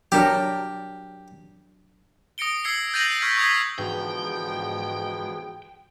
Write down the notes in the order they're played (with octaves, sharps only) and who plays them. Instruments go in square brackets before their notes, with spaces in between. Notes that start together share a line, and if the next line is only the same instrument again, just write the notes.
[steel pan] F#3 D4 A#4 [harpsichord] G4
[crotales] D#6 A#6 C#7 D7 G7
D#6 E6 G#6 C7 C#7 G7
G6 A6 A#6 D#7 F7 F#7
C#6 F6 G#6 B6
C#6 D#6 F6 G#6 B6 C7
[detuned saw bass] G#2 [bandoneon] D3 F3 B3 [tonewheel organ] E3 F#4 G#4 [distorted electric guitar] G5